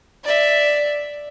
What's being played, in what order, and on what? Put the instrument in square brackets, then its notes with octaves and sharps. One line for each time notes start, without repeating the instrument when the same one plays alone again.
[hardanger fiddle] D5 E5